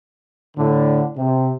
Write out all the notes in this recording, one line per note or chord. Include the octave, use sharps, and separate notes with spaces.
A2 D3
C3